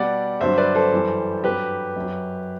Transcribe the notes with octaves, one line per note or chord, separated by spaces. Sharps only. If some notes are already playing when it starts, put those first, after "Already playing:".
Already playing: B2 G3 D5 F#5
G2 D3 F#3 C5 E5
B4 D5
A4 C5
F#2 E3 G3
G2 F#3 G4 B4
F#2 F#3